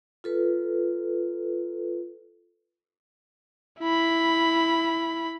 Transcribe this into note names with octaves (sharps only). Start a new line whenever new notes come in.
F4 A4 B4
E4 B5